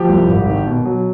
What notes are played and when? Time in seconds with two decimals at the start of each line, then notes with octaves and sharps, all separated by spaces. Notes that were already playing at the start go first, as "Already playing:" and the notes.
Already playing: F3 G4
0.09 C2
0.28 G#1
0.48 D#3
0.66 B2
0.85 F#3